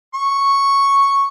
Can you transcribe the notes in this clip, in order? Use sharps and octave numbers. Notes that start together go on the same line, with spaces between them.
C#6